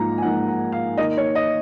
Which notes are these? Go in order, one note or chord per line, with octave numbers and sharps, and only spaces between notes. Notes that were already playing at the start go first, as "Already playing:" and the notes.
Already playing: G#2 F3 A#3 D#4 A#5
G#5
G#2 F3 A#3 D#4 F#5
F#5
F5
D#3 A#3 D#4 D#5
C#5
D#5